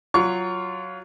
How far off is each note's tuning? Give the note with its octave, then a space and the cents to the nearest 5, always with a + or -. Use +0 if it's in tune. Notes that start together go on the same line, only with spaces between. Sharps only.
F#3 +0 F4 +10 C#6 +35